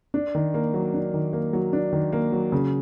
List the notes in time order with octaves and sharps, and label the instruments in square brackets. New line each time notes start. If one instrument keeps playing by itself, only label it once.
[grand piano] D4
D#3
A#3
F#3
D4
D#3
A#3
F#3
D4
D#3
A#3
F#3
C#3